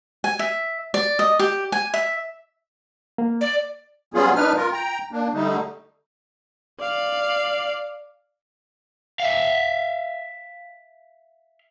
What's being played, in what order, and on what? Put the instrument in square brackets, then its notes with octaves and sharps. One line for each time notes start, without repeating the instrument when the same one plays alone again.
[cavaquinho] G#5
E5
D5
D#5
G4
G#5
E5
[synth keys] A#3
[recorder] D5
[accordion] F#3 G3 B3 C#4 F4 G#4
F#2 D4 D#4 B4 F6
F4 A#4
G5 A#5
A#3 D4
D3 G3 A3 D#4
[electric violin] D5 F5
[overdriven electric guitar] E5 F5